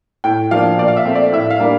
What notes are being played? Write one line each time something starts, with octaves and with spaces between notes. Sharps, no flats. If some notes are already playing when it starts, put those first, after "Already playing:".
A2 G5
F3 A#3 D4 F5
A#2 D5
F5
E5
A3 C4
D5
A2 E5
F5
G3 A#3 D4